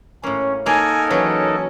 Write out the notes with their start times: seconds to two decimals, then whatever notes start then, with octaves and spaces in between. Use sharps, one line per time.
0.24 A2 A#3 C#4
0.66 A#3 D#4 A4 A#4 G#5
1.11 E3 F#3 C#4